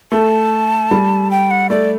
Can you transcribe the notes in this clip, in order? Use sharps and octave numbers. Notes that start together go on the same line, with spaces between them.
A3 A5
G3
G5
F#5
A3 D5